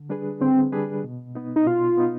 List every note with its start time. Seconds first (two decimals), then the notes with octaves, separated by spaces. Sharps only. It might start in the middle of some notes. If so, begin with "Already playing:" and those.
Already playing: D3
0.09 G3 D4 G#4 B4
0.41 D3 C4
0.72 G3 D4 G#4 B4
1.04 B2
1.35 B3 D#4
1.56 D#4
1.66 B2 F4
1.97 B3 D#4